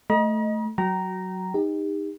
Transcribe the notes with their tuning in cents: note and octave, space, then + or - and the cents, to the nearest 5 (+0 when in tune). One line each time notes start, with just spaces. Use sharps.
A3 +0 D#5 +0 A#5 +45
F#3 +5 G5 -35 A#5 +0
D#4 +0 G4 +40